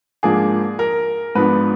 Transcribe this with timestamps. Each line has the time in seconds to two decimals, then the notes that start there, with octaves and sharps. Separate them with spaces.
0.23 G#2 F3 A#3 D4 G#4
0.79 A#4
1.35 G#2 F3 B3 D4 B4